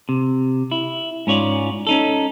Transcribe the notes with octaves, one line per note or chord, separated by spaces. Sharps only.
C3
E4
G#2 C#4 F4 C#5 D5
C#4 D#4 A4